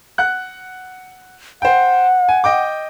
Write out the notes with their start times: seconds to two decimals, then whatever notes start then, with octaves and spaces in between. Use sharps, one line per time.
0.18 F#5 F#6
1.62 C5 F#5 G5
2.29 G#5
2.44 D#5 G5 D6